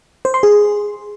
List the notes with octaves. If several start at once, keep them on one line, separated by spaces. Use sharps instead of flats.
C5
C6
G#4